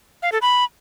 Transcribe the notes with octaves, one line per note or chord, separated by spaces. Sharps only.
F5
A4
B5